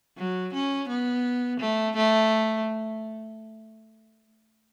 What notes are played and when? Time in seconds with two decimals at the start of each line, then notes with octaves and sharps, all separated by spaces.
0.18 F#3
0.54 C#4
0.89 B3
1.60 A3
1.96 A3